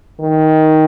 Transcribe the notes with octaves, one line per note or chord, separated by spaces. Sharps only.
D#3